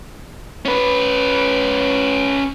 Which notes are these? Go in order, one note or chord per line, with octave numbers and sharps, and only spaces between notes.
C#4 B4